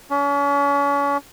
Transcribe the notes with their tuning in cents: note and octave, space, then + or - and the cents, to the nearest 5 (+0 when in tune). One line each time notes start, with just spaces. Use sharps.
C#4 +35